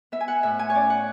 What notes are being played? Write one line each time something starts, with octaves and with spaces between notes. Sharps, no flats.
B3 E5
G#5
F#5
A2 E5
G#5
C#5
C#4 D5
F#5